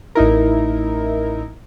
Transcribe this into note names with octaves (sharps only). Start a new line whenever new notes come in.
A1 D#4 E4 A#4